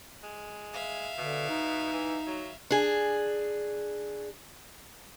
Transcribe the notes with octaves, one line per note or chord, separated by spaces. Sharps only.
G#3
E5 F5
B2 D3
D#4
E3
F#3
D4 G#4